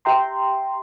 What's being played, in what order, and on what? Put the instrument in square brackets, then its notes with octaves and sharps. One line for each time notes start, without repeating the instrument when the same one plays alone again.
[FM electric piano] G4 E5 G5 A#5 C6